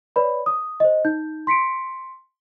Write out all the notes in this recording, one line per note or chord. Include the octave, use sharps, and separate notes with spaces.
B4 C#5 D5 B5
D#6
C5 D#5
D#4 G6
C6 B6 C#7 D7